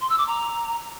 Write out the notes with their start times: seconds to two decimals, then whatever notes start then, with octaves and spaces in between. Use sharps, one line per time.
0.01 C6
0.10 E6
0.18 D6
0.27 A#5